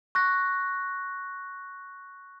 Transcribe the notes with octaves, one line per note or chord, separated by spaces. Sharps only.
C#6 F#6 A#6